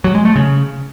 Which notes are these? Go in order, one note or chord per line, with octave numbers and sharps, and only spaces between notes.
F#3
G#3
A3
C#3